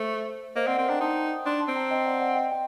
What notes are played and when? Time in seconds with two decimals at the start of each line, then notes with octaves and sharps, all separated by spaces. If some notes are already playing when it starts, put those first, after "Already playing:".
Already playing: A3 C5
0.56 A#3 C5 D#5
0.67 C4 D5 F#5
0.78 C4 A#4 D5
0.89 D4 G5 A#5
1.00 D#4 A5 C6
1.46 D4 A5 C6
1.60 A5 C6
1.68 C4
1.75 G5 A#5
1.91 D#5 G5
2.05 D5 F#5
2.21 D5 F#5
2.35 D#5 G5
2.52 G5